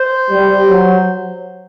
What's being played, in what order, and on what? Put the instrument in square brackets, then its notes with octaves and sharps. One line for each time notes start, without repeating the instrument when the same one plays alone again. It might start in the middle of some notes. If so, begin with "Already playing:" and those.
Already playing: [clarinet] C5
[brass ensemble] G3
F#3